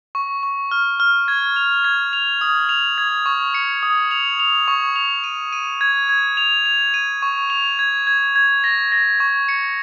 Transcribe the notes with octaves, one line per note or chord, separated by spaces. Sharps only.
C#6
C#6
F6
F6
G#6
F7
G#6
F7
D#6
F7
G#6
C#6
C#7
D#6
F7
F7
C#6
F7
D#7
D#7
G#6
G#6
F7
F7
D#7
C#6
F7
G#6
G#6
G#6
A#6
A#6
C#6
C#7